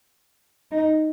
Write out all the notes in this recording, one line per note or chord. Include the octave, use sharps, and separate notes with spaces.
D#4